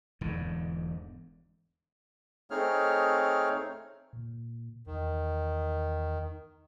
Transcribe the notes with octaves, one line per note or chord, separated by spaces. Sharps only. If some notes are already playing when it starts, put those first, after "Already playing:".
E1 G#2 D3
A3 C4 D#4 G#4 C#5 F6
A#2
E2 D#3